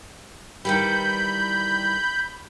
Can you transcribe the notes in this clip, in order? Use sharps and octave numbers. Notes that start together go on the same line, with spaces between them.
D#3 E3 G3 B5 G6